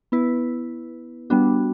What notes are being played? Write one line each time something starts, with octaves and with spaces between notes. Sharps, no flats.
B3 E4 B4
G3 B3 D4 F#4